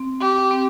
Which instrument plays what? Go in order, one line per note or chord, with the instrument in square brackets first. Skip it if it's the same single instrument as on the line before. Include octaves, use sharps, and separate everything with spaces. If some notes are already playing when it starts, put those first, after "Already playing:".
Already playing: [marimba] C4
[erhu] G4
[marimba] C4